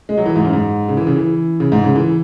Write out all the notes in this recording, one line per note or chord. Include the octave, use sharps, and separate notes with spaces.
G#3
F#3
E3
G#2
F#2
G#2
C#3
E3
C#3
E3
C#3
G#2
C#3
E3